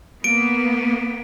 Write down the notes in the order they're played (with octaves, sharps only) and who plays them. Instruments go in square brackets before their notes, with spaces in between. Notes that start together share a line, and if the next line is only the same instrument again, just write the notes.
[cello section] A#3 B3 [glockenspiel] D7